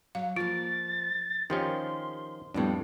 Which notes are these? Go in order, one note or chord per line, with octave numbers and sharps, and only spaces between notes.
F#3 F5
F3 A#3 F4 A6
D#3 F3 C#4 G4 C6
F2 A2 G3 B3 D4